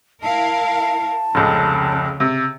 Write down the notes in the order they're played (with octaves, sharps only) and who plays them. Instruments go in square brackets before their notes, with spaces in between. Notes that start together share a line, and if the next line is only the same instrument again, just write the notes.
[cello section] E4 A#4 F5 [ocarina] A5
[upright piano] F1 C#2 [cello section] C#3
[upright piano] C3